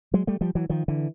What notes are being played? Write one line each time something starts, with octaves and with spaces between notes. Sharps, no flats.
F#3 G#3
G3 A3
F3 G3
E3 F#3
D#3 F3
D3 E3